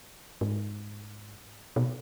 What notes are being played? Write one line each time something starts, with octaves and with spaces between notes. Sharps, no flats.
G#2
B2